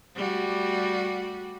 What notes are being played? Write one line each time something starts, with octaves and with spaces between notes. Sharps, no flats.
G3 A3 F#4